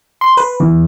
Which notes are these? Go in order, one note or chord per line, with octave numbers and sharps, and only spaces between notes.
C6
B4
E2